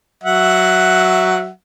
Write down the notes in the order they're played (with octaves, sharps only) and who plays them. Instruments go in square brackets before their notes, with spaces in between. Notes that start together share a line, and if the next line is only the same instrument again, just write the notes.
[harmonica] F#3 E5 F#5